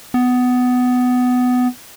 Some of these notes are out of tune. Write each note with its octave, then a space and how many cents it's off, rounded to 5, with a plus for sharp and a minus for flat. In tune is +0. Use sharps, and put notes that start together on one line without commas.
B3 +15